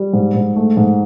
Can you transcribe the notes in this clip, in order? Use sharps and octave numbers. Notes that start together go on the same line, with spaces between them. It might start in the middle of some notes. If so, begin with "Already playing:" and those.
Already playing: G3
G#2
G#2
A3
G#2